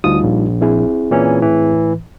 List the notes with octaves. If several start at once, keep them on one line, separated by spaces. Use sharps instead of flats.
D2 G3 D#4 F4 D#6
A#1
C4 E4 G#4
A#2 E3 C#4
A2 E3